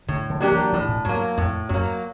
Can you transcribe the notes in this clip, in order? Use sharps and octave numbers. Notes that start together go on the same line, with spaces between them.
A2 D3
D3
F#3 A#3 D4 G4
E3
A2 E3
A#2
G2 F#3 A#3
F2 A2
F#2 F#3 A#3